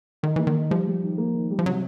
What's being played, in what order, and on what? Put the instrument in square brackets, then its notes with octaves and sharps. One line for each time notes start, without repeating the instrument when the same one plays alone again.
[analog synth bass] D#3 [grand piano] D#4
[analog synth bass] E3 [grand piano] A#3
[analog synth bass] D#3
[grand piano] D#4
[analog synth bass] F3 [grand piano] G3
[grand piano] G3
D#3
A#3
D#3
G3
[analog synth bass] F3
[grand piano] C3 [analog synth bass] F#3